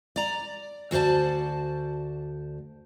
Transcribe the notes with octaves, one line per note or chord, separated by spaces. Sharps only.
D5 A#5
D2 F#4 C5 D5 A5